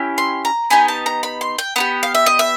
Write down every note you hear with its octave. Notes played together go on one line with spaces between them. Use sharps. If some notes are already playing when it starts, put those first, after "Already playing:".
Already playing: C#4 E4 G4
C6
A#5
B3 D#4 G4 G#5
A5
A#5
B5
C6
G5
B3 D#4 G4 F#5
F5
E5
D#5
E5